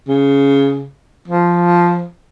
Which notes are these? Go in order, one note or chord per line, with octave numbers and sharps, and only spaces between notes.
C#3
F3